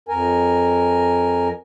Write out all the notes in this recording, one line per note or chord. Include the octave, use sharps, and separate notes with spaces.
F2 A#4 G#5